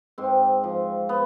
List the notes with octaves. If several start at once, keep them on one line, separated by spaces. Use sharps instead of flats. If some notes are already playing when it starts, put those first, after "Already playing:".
G#2 C4
F3
B3